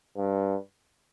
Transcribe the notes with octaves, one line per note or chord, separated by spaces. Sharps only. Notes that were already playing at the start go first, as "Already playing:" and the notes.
G2